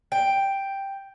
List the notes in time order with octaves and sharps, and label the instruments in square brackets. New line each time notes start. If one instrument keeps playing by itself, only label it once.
[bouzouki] G5